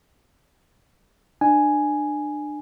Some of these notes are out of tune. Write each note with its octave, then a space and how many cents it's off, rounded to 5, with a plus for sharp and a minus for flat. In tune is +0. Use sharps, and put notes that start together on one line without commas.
D4 +25 G#5 +5